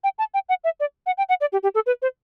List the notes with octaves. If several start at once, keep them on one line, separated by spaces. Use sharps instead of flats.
G5
A5
G5
F#5
E5
D5
F#5
G5
F#5
D5
G4
G4
A4
B4
C5